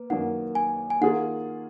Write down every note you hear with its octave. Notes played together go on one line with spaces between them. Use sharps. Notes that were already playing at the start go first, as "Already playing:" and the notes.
Already playing: A#3 B4
F#2 D#3 A#3 F#5
G#5
G#5
D#3 A#3 F4 G#4 F#5